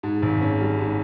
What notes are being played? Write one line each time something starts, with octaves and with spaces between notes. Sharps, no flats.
G#2
G#1
C#4
G3
G#2